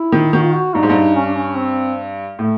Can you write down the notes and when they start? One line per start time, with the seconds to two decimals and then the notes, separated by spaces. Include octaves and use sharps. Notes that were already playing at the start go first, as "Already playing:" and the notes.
Already playing: E4
0.12 D#3
0.33 D#3 F#4
0.43 F4
0.53 F#4
0.74 G2 D#4
0.83 G#2
0.90 G2
1.15 C#4
1.26 D4
1.36 C#4
1.57 C4
2.38 A2 A3